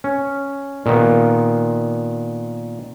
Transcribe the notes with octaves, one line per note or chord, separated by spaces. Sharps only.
C#4
A#2 D#3 B3